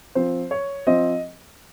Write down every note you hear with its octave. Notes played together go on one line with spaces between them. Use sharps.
F3 C4 C5
C#5
F3 C4 D#5